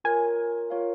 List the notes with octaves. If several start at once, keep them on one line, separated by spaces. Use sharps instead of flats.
F4 A#4 C#5 G#5
F4 A#4 C#5 F5